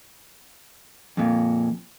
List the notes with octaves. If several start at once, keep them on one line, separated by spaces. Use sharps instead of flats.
F2 A#2